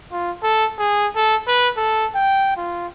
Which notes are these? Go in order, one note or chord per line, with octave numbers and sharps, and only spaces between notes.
F4
A4
G#4
A4
B4
A4
G5
F4